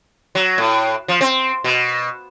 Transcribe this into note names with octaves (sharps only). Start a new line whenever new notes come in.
F#3
A2
F3
C4
B2